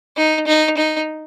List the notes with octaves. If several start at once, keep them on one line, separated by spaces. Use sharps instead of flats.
D#4
D#4
D#4